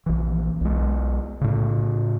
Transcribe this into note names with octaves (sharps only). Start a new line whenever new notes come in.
A#1 E3
B1 G#3
A2 C#3